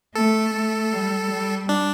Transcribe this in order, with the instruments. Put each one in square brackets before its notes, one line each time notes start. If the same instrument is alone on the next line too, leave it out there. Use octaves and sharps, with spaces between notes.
[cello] A3 [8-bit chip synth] A4
[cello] A3
G3
G3
[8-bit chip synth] D4